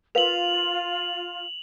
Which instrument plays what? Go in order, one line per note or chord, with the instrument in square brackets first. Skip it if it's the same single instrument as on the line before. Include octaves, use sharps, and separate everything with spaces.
[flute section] F4 [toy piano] A#4 B4 F5 [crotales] F7 F#7